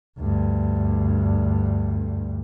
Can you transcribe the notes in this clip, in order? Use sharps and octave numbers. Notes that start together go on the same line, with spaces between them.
D2 G2